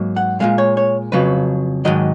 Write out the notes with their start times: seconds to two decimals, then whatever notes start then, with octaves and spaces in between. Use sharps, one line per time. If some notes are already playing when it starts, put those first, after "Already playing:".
Already playing: G#2 F#3 A#3
0.16 F#5
0.40 A#2 F3 G#3 F5
0.58 C#5
0.77 C#5
1.12 F2 C#3 F#3 B4
1.85 G#2 D#3 F#3 D#5